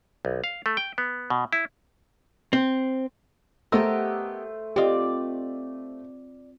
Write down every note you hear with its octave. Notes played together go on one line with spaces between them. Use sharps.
B1
F5
A3
G5
B3
B2
E4
C4
A3 B3 G4 A#4 C5 D#5 E6
C4 F4 G4 D5 D#5